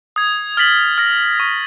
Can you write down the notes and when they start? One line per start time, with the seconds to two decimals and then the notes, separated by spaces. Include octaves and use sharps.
0.16 D#6 G#6
0.57 F6 A6 B6 F#7
0.98 F6 A#6
1.40 C#6